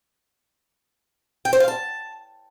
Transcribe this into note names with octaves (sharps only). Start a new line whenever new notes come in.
G5
C5
F5
A5